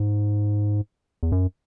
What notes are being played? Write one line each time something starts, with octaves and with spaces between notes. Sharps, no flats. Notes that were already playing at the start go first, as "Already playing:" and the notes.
Already playing: G#2
E2
F#2